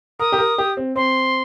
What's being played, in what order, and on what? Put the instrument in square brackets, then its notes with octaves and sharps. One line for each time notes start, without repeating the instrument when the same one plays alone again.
[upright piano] A#4 [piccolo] D#6
[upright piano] G4
A#4
G4
C4
[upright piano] C4 [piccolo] C6